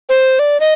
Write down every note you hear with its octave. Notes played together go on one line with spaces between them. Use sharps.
C5
D5
D#5